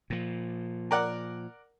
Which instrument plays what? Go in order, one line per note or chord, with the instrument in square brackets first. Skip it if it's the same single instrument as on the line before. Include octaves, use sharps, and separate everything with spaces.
[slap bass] A#2 F3
[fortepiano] A#4 D5 F#5